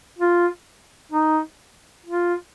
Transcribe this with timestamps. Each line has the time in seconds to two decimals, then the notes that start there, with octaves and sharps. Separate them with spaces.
0.19 F4
1.12 D#4
2.06 F4